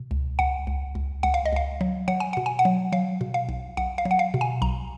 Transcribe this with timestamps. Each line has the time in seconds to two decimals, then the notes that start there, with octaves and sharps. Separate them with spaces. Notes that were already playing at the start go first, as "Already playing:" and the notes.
Already playing: B2
0.11 C#2
0.39 C#2 F#5
0.67 C#2
0.95 C#2
1.23 C#2 F#5
1.34 F5
1.45 D#5
1.53 C#2 F5
1.81 F#3
2.08 F#3 F#5
2.20 G#5
2.33 B2 F#5
2.46 G#5
2.59 F#5
2.65 F#3
2.92 F#3 F5
3.21 B2
3.34 F5
3.49 B1
3.77 B1 F#5
3.98 F5
4.05 F#3
4.11 F#5
4.19 F5
4.34 B2
4.41 G#5
4.62 B1 A#5